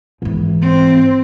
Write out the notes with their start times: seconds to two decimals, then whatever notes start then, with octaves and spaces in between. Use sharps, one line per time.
0.22 G#2 E3
0.61 C4